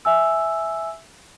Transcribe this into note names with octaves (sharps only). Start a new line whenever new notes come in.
E5 G#5 E6